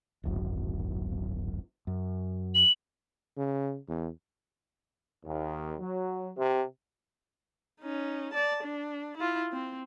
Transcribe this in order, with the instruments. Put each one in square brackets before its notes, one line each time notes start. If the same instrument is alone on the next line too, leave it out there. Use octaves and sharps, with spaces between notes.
[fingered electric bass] D1 G#1 F#2
F#2
[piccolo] F#7
[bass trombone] C#3
E2
[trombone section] D#2
F#3
C3
[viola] C#4 D#4
D5 A5
D4
E4 F4
C4